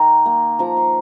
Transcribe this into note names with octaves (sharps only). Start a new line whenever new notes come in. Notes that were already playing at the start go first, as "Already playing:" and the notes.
Already playing: D#3 D#4 A#5
A#3
F3 A#5
C6